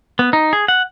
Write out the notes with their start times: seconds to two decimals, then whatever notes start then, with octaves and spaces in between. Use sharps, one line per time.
0.19 B3
0.33 D#4
0.53 G#4
0.68 F#5